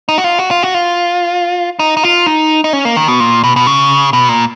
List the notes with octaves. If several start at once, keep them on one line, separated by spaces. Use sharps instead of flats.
D#4
F#4
F4
F#4
F4
F#4
F4
D#4
D#4
F4
D#4
D#4
C#4
A#3
D#3
B2
A#2
B2
B2
C#3
B2
A#2